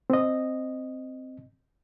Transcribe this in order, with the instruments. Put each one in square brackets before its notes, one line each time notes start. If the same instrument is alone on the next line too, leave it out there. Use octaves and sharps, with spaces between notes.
[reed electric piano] C4 D#5